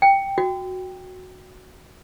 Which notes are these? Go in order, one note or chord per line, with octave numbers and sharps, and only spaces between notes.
G5
F#4